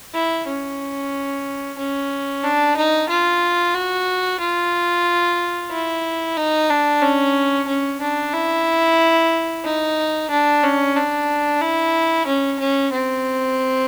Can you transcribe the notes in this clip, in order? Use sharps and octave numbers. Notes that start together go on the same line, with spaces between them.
E4
C#4
C#4
D4
D#4
F4
F#4
F4
E4
D#4
D4
C#4
C#4
D4
E4
D#4
D4
C#4
D4
E4
C#4
C#4
C4